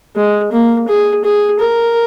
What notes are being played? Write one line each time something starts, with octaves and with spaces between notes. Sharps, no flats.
G#3
A#3
G#4
G#4
A#4